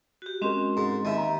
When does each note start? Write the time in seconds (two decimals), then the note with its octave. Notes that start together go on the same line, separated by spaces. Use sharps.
0.22 F#4 G4
0.42 G#3 C4 C#4 F#4 A#4 C6
0.77 G#2
1.05 D#2 D#5 E5
1.17 A#5